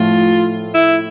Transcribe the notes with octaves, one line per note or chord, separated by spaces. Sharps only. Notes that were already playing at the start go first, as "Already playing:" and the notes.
Already playing: A2 F3 A3 F4
E4